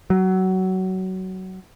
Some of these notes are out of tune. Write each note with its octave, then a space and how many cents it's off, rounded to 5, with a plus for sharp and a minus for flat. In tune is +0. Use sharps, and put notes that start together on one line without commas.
F#3 +20